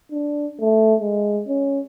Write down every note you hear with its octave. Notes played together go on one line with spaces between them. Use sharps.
D4
A3
G#3
C#4